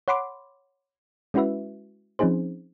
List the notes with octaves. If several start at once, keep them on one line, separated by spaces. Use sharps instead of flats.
C#5 F#5 B5 C6 D6
G#3 C#4 E4 F#4 B4 E5
F3 C4 C#4 D#4 G#4 C5